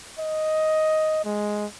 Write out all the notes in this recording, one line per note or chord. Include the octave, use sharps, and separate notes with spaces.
D#5
G#3